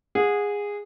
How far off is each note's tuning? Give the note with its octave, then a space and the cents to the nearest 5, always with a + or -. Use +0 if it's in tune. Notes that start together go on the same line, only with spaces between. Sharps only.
G#4 -15 F#5 -30